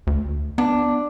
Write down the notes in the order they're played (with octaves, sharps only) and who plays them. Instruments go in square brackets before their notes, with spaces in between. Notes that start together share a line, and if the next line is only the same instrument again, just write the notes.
[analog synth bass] D2
[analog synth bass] B3 [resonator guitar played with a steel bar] D4